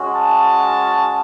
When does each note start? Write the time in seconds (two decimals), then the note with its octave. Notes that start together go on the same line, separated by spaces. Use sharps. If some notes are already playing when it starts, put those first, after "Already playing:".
Already playing: G#3 C#4 F#4
0.15 A5